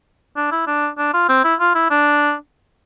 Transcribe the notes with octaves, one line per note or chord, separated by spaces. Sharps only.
D4
E4
D4
D4
F4
C4
E4
F4
E4
D4